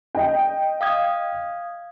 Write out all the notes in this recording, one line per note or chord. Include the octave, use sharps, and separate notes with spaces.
D#5 G5
F5 D#6 G#6